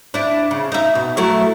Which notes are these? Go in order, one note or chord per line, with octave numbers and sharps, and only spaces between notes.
D4 E4
C#3
D#4 E5
B2
F#3 A3 E4